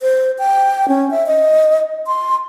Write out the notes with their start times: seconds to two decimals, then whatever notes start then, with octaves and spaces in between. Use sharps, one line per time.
0.01 C5
0.39 G5
0.88 C#4
1.11 E5
1.27 D#5
2.07 C6